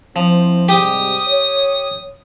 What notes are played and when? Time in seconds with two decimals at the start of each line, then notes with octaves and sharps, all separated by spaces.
0.16 F3 C4 E4 C5
0.69 G#2 C3 G3 G4 G5 D#6
1.28 C#5